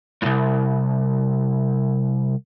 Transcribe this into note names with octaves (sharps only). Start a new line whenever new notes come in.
C2 F2